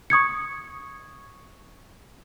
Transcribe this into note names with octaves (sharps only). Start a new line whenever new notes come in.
C#6 D#6 G#6 C#7